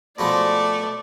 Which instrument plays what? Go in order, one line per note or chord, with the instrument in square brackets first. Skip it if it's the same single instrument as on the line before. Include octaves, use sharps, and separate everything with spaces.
[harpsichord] B2 F3 G#3 [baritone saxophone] A3 [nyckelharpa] D5